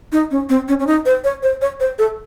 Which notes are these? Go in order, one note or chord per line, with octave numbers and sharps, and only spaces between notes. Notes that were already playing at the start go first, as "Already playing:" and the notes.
D#4
C#4
C4
C#4
C#4
D#4
C5
C#5
C5
C#5
C5
A4